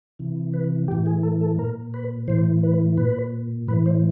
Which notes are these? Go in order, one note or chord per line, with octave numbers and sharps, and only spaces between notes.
C3 E3
B4
A2 E3 G4
G#4
A4
A4
A#2 A#4
B4
A2 E3 C5
B4
A#2 B4
A2 E3 B4
C5